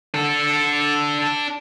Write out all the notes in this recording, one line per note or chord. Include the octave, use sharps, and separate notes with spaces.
D4 A4